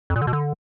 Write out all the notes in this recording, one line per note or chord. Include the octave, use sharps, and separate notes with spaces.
F2
A#2
D3
B2
D3